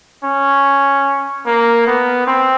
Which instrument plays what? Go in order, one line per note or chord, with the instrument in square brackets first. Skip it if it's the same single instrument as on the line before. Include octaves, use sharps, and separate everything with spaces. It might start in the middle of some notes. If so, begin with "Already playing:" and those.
[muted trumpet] C#4
A#3
B3
C4